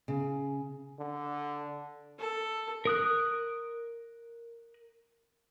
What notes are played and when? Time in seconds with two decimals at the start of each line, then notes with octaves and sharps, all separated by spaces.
0.08 C#3
0.99 D3
2.19 A4
2.85 A#4 D#6 F#6